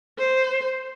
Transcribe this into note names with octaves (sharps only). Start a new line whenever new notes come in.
C5